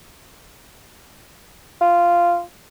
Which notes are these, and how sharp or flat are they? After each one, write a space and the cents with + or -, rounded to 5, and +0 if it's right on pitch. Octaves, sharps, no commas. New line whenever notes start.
F4 -10